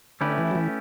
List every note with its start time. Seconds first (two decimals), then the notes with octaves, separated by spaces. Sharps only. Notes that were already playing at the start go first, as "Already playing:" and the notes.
0.21 D3 A3 C#4 E4 G4 B4
0.38 E3
0.51 F#3
0.55 E3